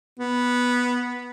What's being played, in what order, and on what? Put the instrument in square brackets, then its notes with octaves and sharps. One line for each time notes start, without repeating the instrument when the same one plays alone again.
[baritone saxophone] B3